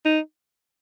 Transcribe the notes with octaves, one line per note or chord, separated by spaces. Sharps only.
D#4